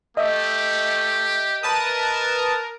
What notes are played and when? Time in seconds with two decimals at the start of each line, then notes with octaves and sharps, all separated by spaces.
0.17 A3 G4 D#5 E5
1.63 A#4 B4 A5 D#6